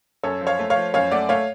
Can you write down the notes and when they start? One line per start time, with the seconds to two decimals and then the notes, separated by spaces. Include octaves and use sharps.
0.23 F#2 A4 C#5
0.41 F3
0.47 C#5 F5
0.59 A3
0.70 C#5 F5
0.76 F3
0.94 F#2 C#5 F5
1.11 A3 D5 F#5
1.29 A3 C#5 F5